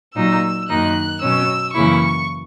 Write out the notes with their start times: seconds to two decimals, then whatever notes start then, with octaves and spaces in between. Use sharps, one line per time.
0.15 A#2 F#3 A#3 D#4 E6
0.69 F#2 D#3 A#3 D#4 F#6
1.22 B2 F#3 C#4 E6
1.75 F#2 C#3 E3 A#3 E4 C#6